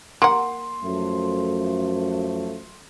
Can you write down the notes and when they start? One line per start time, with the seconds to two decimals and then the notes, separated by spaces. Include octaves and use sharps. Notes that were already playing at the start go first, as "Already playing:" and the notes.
0.22 A#3 F#5 C6
0.82 F#2 F3 A3